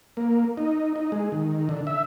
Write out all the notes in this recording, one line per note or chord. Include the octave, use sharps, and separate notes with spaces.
A#3
D#4
D#4
G#3
D#3
D3
E5